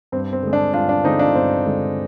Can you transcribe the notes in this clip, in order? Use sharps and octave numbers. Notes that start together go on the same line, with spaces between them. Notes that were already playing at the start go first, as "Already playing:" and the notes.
G2 C4
C4
D3 G#3
D4
G2 D4 F4
D4
D3 G#3 C4 D#4
D4 F4
G2 C4
D3 G#3